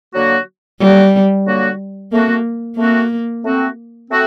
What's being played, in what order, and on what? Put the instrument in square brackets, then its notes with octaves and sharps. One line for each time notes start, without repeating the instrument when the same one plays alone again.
[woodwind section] D3 F#3 A#3 F#4
[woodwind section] D3 F#3 A#3 F#4 [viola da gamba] G3
[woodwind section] D3 F#3 A#3 F#4
[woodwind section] A3 C4 F#4 [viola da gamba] A#3
[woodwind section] A3 C4 F#4 [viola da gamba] A#3
[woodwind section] A3 C4 F#4
A3 C4 F#4